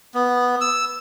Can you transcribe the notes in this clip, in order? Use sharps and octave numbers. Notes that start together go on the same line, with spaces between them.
B3
E6